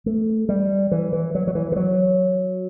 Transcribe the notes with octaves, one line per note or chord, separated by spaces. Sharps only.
A3
G3
E3
E3
F#3
F#3
E3
E3
F#3